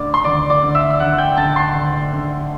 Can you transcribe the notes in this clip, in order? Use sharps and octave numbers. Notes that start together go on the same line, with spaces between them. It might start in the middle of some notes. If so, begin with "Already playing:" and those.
Already playing: D2 D3 D5 D6
C6
D2 D5 D6
D5 D6
D3
E5 E6
E6
D2 F#5 F#6
G5 G6
D3 A5 A6
C6 C7
D2
D3